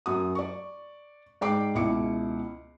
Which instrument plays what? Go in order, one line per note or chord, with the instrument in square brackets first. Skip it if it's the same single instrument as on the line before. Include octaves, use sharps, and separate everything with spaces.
[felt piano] F#2 F#4 D#6
D5 C#6
G#2 D5 G5 D6 C7 D7
C#2 B2 E4 D6 C#7